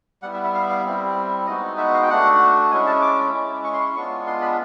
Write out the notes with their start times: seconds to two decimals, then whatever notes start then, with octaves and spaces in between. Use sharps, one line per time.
0.23 G3 B3 E4 F#5
0.34 E5
0.44 E5
0.54 F5
0.62 E5
0.69 F5
0.85 G3 C4 E4
1.47 G#3 B3 D#4 F#4 D#5
1.78 E5
1.94 F5
2.03 G5
2.09 A3 D4 F#4 F#5
2.71 G#3 C#4 E4 G#5
2.87 A5
3.02 D6
3.34 G#3 C#4 E4
3.64 C#6
3.73 C6
3.80 C#6
3.96 G#3 B3 D4 F4 C#6
4.27 C6
4.42 B5